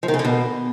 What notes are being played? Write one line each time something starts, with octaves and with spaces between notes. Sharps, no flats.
F3
D#3
C#3
D3
B2